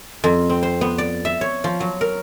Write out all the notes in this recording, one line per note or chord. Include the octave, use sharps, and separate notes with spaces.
F2
C4
C5
B3
D5
E5
C#5
F3
F#3
A#4